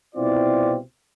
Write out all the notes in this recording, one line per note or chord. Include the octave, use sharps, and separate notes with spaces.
C2 B2 C4 E4 F4 D5